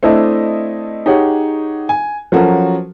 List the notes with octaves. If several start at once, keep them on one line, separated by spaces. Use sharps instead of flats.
A3 C4 D4 E4 A4 D#5
D#4 G4 G#4 C#5 F#5
G#5
F3 F#3 C#4 F#4 A4 A#4